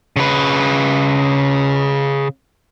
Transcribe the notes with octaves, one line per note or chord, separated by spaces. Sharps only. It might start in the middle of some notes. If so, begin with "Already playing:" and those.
C#3 B4